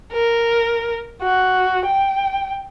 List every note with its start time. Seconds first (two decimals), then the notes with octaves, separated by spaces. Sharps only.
0.13 A#4
1.23 F#4
1.86 G5